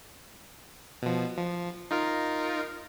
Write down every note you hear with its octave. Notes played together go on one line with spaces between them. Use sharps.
B2 F3
F3
D#4 F4 A#4